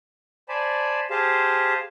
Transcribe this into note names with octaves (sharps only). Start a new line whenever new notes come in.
C5 D5 G#5 A5 B5
G4 G#4 C5 F5 A5